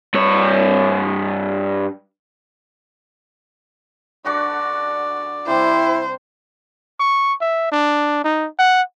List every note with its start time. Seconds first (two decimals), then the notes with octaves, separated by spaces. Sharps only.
0.14 G2 C#5
4.25 D3 D4 F#4 D5
5.47 C3 G3 E4 C5
7.00 C#6
7.41 E5
7.72 D4
8.24 D#4
8.59 F#5